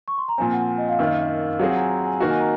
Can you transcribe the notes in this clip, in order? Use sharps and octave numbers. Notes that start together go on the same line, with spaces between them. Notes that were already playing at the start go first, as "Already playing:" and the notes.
C#6
C6
A#5
A#2 F3 C4 G#5
F#5
F#5
D#5
F5
F#2 D#3 A#3
F#3 C4 F4 G#4 F#5
F#5
A#5
G#5
A#5
G#5
D#3 A#3 D#4 F#4 F#5
G#5
A#5